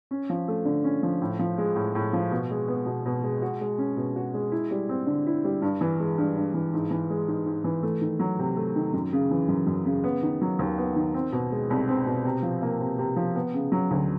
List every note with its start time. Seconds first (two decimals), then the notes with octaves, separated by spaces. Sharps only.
0.11 C#4
0.30 F3
0.48 A3
0.65 D3
0.84 C#4
1.03 F3
1.22 A2
1.39 F3
1.58 G#3
1.76 A2
1.95 A2
2.13 F3
2.31 B2
2.50 G#3
2.68 B3
2.86 B2
3.06 B2
3.23 G#3
3.42 F#4
3.61 G#3
3.78 C#4
3.97 B2
4.16 F#4
4.34 G#3
4.52 E4
4.71 G3
4.89 C4
5.07 D3
5.26 E4
5.44 G3
5.62 G2
5.81 E3
5.99 G#3
6.18 G2
6.36 G2
6.54 E3
6.73 G#2
6.91 E3
7.10 G#3
7.28 G#2
7.46 G#2
7.64 E3
7.83 A3
8.01 D#3
8.20 F#3
8.39 C3
8.57 A3
8.76 D#3
8.93 F#2
9.13 C#3
9.31 E3
9.48 F#2
9.67 F#2
9.85 C#3
10.04 B3
10.23 D#3
10.42 F#3
10.59 D#2
10.78 B3
10.96 D#3
11.14 C4
11.32 B2
11.51 G#3
11.70 C2
11.88 C4
12.06 B2
12.24 C3
12.43 F3
12.62 A#3
12.80 C3
12.99 C3
13.16 F3
13.35 B3
13.54 C#3
13.72 F#3
13.91 D2